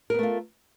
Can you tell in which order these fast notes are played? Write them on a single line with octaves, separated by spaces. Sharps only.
A#4 B3 A3 F4